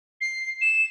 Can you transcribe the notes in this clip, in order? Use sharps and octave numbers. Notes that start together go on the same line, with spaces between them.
C7
E7